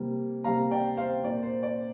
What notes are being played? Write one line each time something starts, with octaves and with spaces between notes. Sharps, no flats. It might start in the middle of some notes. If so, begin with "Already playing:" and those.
Already playing: C3 G3 A#3
C3 G3 A#3 F5 A#5
D5 G5
C5 F5
A#2 A#3 D5
C5
D5